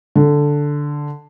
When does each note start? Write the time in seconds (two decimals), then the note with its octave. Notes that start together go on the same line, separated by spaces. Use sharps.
0.16 D3